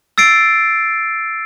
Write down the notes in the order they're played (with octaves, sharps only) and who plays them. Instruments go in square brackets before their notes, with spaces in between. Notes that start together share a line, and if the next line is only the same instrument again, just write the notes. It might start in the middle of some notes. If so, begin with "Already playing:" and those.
[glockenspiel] E6 A6 C7 D7